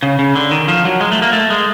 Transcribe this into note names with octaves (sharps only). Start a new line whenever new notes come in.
C#3
C#3
D3
D#3
F3
F#3
G#3
A3
A#3
A3
G#3